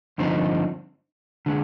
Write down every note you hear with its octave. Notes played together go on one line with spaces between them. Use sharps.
G2 D3 F3 C4 D#4
D3 G#3